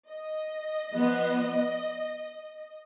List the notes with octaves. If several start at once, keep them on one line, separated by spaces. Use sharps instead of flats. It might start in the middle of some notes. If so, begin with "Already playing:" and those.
D#5
F3 B3